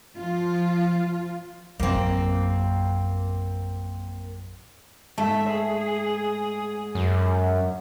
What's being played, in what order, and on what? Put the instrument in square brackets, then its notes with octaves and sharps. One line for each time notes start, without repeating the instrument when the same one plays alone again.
[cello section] F3 F4
[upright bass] A#1 F#2 [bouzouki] A#3 C4
[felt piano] G#2 [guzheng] A3 [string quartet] E5
[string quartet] G#4
[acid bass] F#2